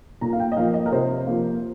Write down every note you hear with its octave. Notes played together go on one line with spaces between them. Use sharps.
A#2 A#5
F5
G5
D#5
F3 A#3 F5
D#5
A#4
C3 C5
F3 A#3